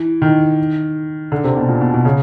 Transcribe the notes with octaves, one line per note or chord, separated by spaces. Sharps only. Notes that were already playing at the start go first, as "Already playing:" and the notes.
Already playing: E3
D#3
D3
C3
B2
A#2
B2
B2
C#3